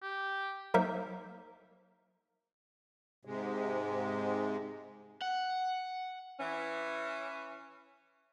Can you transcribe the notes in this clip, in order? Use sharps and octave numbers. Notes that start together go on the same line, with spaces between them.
G4
F#3 A#3 D#4 A#4 C5 E5
G#2 C3 G#3
F#5
E3 C#4